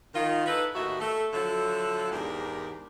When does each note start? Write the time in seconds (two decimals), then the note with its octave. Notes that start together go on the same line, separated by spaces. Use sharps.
0.15 D#3 F4
0.46 D#4 E4 A4 B4
0.75 D#2 A2 D#3 F#4 E5
1.00 A3 A4
1.33 D3 F3 F#3 E4 A4
2.12 E2 G#2 D4 G4 G#4 A#4